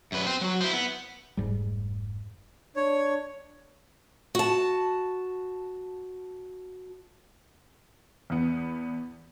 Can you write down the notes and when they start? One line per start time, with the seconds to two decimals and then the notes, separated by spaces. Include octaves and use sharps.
0.12 F#2 B4
0.26 C5 G5
0.41 F#3 F#4
0.61 E4 C5
0.73 B3
1.37 F1 G#2 G3
2.76 D4 C#5
4.35 F#4 A5
8.30 E2 B3